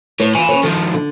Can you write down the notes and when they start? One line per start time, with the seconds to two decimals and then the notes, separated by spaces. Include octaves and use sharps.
0.20 A2 B4 C#5
0.35 E3 F4 G#5 B5
0.49 C#4 B4 C#5
0.63 D#3 F3 A4
0.94 D3